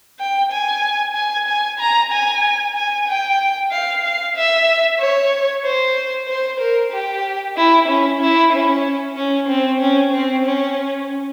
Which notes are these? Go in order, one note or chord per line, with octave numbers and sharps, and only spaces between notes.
G5
G#5
G#5
G#5
A#5
G#5
G#5
G5
F5
F5
E5
C#5
C5
C5
A#4
G4
E4
C#4
E4
C#4
C#4
C4
C#4
C4
C#4